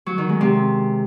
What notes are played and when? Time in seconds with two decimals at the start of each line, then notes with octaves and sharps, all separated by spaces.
0.06 F#3
0.18 D#3
0.29 G#3
0.41 C3